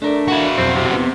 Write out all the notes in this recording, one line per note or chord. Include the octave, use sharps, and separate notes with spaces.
A3 D4 A#4 D5
E4 F#4
B1 F2 C4
C3
B3 C4